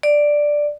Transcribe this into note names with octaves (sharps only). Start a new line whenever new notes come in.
D5